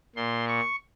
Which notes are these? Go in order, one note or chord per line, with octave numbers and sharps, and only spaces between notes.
A#2 C6
C#6